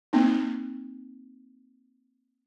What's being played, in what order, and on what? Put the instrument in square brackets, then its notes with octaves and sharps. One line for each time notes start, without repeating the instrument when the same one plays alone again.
[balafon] A#3 C4 D#4